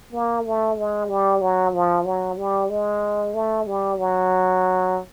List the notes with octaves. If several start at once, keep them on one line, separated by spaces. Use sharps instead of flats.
A#3
A3
G#3
G3
F#3
F3
F#3
G3
G#3
A3
G3
F#3